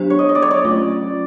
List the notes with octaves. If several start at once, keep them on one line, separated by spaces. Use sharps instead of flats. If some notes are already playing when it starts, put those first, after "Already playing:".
Already playing: F#3 B3 D4 G4 C5
C#5
D#5
D#5
D5
C#5
D5
F#3 A3 C#4 F4